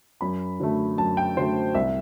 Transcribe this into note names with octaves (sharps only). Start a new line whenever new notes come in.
F#2 B5
D3 F#3 A3
F#2 A5
G5
D3 F#3 A3 C5
C2 E5